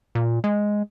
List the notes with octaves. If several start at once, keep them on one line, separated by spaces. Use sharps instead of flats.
A#2
G#3